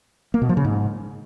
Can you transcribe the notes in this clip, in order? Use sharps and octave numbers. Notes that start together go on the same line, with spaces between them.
A#3
B2
F3
C#3
G#2